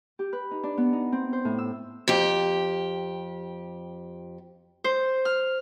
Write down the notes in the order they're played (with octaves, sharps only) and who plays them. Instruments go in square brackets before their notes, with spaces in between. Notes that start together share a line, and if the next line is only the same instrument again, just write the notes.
[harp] G4
B4
D#4
D4
B3
D#4
C4
C5
A2
E6
[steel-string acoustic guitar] F2 G4
[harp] C5
F6